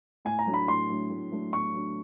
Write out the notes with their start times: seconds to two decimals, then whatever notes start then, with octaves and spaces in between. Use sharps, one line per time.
0.25 A2 G#5
0.39 A#5
0.46 F#3 A3 D4
0.54 B5
0.68 A2 C6
0.89 F#3 A3 D4
1.10 A2
1.31 F#3 A3 D4
1.53 A2 C#6
1.74 F#3 A3 D4